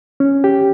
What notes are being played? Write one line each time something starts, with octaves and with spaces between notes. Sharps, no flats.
C#4
G4